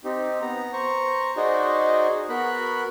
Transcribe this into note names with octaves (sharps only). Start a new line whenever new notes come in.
C4 D#4 G4
B3 A#5
C5 A#5 C#6
D#4 F#4 G#4 C5 D5 D#5
B3 F#4 A#4 B5 F#6